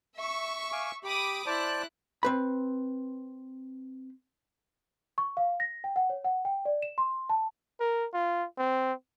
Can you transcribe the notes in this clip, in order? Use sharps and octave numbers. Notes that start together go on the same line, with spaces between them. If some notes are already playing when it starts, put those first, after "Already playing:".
E5 C#6
F5 G#5 D6
G4 B5 D6 D#6
E4 C5 D5 A5 F#6
C4 B4 B5
C#6
F5
A#6
G5
F#5
C#5
F#5
G5
D5
E7
C6
A5
A#4
F4
C4